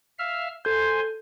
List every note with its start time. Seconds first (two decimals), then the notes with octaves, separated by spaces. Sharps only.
0.19 E5 F5 F6
0.65 A4 C5 G#5 C6 G6